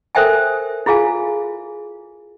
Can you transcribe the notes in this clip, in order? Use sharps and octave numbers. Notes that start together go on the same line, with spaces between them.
A4 A#4 C5 E5 G5 G#5
E4 F4 G#4 F5 G#5